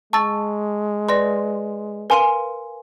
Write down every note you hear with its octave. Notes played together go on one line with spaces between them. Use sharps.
G#3 A5 C#6 E6 A6
B4 D5 C6 A#6
A#4 B4 F5 G#5 C6 D#7